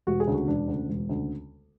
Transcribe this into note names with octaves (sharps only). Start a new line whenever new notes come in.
E1 F#4
G#4
D2 C#3
F#4
E1 D4
D2 C#3
E1
D2 C#3